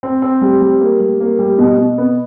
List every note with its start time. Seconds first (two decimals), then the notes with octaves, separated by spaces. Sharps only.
0.03 C4
0.22 C4
0.42 G3
0.61 G3
0.81 A#3
1.00 G3
1.20 A#3
1.39 G3
1.58 B2
1.78 B2
1.98 B3